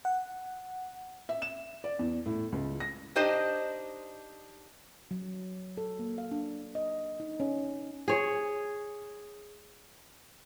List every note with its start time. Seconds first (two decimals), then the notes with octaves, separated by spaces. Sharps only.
0.05 F#5
1.29 E5
1.42 E7
1.84 D5
1.99 E2
2.26 A2
2.52 C#2
2.80 A#6
3.16 D4 D#4 G4 C5 D#5
5.11 F#3
5.77 A4
5.99 A#3
6.18 F5
6.31 D4
6.75 D#5
7.20 D#4
7.40 C#4
8.08 G#4 C#5